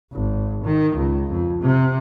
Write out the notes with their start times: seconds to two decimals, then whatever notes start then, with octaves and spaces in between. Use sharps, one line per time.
0.13 G#1
0.64 D#3
0.96 C#2
1.31 F2
1.61 C3